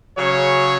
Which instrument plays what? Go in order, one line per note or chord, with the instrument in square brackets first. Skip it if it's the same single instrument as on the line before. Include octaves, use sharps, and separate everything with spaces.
[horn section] C#3 F#3 C#5